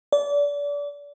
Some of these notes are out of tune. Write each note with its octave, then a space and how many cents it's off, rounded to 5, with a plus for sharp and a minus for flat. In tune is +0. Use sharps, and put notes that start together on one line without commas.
D5 -30